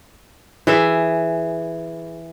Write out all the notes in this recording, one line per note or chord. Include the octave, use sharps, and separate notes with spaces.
E3 G#4 E5